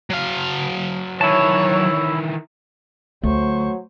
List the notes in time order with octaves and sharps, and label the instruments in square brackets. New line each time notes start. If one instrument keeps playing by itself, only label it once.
[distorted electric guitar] F#3 F5
[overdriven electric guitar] D#3 E3 [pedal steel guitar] E4 A5 [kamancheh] C#5
[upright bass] D2 [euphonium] F#3 [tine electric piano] A3 [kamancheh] C5 C#6